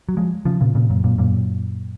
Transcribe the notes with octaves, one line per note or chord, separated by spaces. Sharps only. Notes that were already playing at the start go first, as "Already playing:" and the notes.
F#3
F3 G#3
C#3 F3
A#2 C#3
A#2 C#3
F#2 A#2
F#2 A#2
F#2 A#2